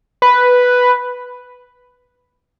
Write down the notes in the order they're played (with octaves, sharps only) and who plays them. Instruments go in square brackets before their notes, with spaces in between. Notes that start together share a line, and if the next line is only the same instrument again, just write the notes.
[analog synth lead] B4